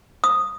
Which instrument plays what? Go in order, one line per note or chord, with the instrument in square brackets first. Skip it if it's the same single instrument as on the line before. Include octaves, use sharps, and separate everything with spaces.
[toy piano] D#6